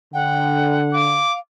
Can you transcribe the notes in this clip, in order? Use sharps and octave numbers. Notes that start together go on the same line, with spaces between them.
D3 F#5 G5
F5 D6